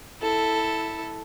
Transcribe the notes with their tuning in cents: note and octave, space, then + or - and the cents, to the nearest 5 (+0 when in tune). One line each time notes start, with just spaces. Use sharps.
E4 -10 A4 +0